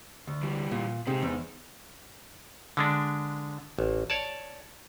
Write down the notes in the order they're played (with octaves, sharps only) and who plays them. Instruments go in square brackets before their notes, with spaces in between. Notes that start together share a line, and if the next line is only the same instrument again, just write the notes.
[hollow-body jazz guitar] D2
[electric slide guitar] E3 G3
[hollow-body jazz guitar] A#2
[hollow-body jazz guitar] C3 [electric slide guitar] D#4 G#4 C5
[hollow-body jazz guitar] E2
[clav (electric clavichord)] D3 G#3 D4
A1
C#5 D5 A5